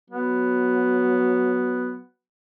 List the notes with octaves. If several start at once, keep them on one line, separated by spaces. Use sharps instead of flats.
F#3 B3